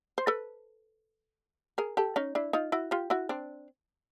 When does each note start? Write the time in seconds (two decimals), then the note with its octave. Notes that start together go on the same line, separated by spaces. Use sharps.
0.18 C5
0.27 A4 B4
1.78 G#4 A#4
1.97 G4 A4
2.16 C#4 D#4
2.35 D4 E4
2.53 D#4 F4
2.72 E4 F#4
2.91 F4 G4
3.10 E4 F#4
3.29 C4 D4